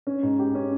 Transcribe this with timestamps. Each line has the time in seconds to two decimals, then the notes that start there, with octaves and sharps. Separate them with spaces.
0.07 C#4
0.23 G#2
0.39 G4
0.55 C#4